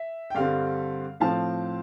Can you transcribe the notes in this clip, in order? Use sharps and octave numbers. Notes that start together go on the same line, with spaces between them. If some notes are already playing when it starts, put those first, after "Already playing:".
Already playing: E5
G5
G2 D3 G3 C4 F5
A2 F3 C4 F5 A5